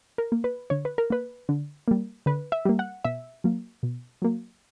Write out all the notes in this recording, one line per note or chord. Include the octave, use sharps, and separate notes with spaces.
A#4
A#3
B4
D3 C#5
B4
A#4
A#3 B4
D3
G3 A#3
D3 B4
E5
G3 A#3
F#5
B2 E5
F#3 A#3
B2
F#3 A#3